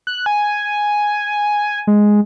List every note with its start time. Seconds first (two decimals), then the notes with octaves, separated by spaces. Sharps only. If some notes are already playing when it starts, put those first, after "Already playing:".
0.07 F#6
0.26 G#5
1.87 G#3